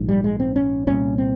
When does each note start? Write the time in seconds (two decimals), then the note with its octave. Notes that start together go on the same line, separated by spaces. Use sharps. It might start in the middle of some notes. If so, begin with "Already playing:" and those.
Already playing: A#1 G#2
0.09 G3
0.24 G#3
0.40 C4
0.56 C#4
0.87 C2 A#2 C#4
1.18 C4